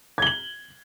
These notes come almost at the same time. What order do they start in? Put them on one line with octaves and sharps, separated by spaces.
G#6 G7 F#7